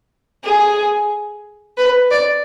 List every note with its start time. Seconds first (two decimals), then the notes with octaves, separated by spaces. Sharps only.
0.44 G#4
1.77 B4
2.11 D5